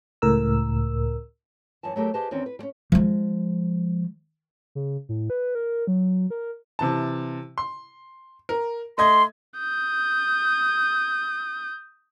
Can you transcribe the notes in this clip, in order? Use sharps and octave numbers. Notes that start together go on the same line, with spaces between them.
C#2 A2 A#4 E6
F#2 E3 G#5 A5
F#3 A3 G4 G#4 A#4
G4 G#4 B4 C5 D#5 A5
E2 D#3 C4 C#4
B4
G3 C#4
F3 G#3
C#3
A2
B4
A#4
F#3
A#4
C3 E3 A5
C6
A#4
A3 D#5 C6 G#6
D#6 G6